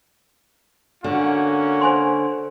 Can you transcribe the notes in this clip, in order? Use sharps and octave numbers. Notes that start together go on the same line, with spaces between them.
D3 A#3 C#4 F#4
C5 G#5 C6